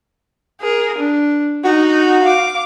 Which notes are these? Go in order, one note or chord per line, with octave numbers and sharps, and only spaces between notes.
G#4 A#4
D4
D#4 F#4
F5 D6